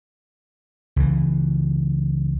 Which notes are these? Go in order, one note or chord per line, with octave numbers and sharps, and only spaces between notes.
C#2 E3